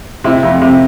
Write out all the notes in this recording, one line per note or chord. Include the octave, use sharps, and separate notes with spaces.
C3 E4
F2
C3